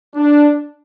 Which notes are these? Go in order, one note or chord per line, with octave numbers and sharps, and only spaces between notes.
D4